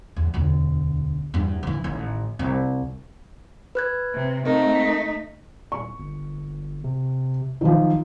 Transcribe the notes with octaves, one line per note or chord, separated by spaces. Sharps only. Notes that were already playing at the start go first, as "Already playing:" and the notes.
E2
E1 D2
E2 G2
D#3 E3
A1 D#3
C2
B4 F#6 G#6
C3
A3 C4 D#4 A#4
B6
D#1 C#6
G1
C3
B1 D#3 F3